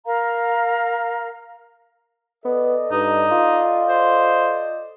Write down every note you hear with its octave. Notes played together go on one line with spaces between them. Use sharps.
A#4 F5 A#5
B3 A4 D5 D#5
G2 D#4
F4
C5